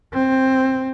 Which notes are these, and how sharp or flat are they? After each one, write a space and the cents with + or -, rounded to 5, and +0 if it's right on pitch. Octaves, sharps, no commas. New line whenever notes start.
C4 +10